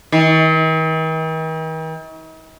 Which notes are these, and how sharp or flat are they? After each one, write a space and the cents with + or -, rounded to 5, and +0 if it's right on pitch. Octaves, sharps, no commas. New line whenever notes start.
D#3 +45